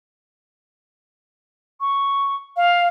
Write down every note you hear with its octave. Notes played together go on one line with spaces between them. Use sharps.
C#6
F5